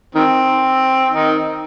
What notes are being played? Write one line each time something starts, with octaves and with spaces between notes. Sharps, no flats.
D#3 C4
D#3 D#4